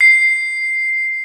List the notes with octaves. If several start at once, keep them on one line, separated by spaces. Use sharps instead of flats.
C7